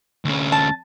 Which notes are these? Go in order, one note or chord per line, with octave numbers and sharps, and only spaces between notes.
D2 C#4
A5